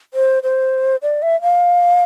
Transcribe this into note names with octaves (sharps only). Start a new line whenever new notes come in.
C5
C5
D5
E5
F5